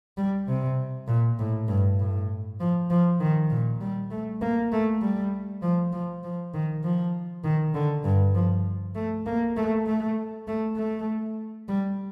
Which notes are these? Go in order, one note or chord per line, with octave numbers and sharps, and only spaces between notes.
G3
C3
A#2
A2
G2
A2
F3
F3
D#3
A#2
G3
A3
A#3
A3
G3
F3
F3
F3
D#3
F3
D#3
D3
G2
F3
A3
A#3
A3
A3
A3
A3
G3